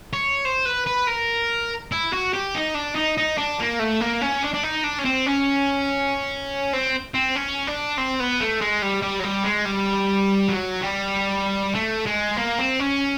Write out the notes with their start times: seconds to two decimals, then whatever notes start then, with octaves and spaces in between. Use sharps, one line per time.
0.13 C#5
0.45 C5
0.66 B4
0.87 B4
1.08 A#4
1.92 E4
2.13 F#4
2.34 G4
2.55 D#4
2.75 D4
2.96 D#4
3.18 D#4
3.38 D4
3.59 A#3
3.79 A3
4.00 A#3
4.21 C#4
4.43 D4
4.54 D4
4.63 D#4
4.84 D4
4.99 C#4
5.05 C4
5.26 C#4
6.73 C4
7.14 C4
7.36 C#4
7.67 D4
7.98 C4
8.20 B3
8.41 A3
8.61 G#3
8.82 G3
9.02 G3
9.20 F#3
9.24 G3
9.44 G#3
9.65 G3
10.49 F#3
10.81 G3
11.75 A3
12.06 G#3
12.37 A#3
12.59 C4
12.80 C#4